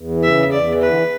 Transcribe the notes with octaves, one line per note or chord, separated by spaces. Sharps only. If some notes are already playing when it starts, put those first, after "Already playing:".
Already playing: E2
E3
C#3 E5
E2
E2 D5
E3
D3 B4